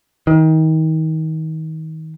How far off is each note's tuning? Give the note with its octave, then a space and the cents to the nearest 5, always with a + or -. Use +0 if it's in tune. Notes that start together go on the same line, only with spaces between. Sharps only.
D#3 +30